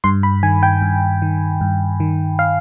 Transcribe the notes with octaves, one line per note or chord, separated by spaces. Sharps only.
G2 C6
B5
D#3 G#5
G5
G2
D#3
G2
D#3
F5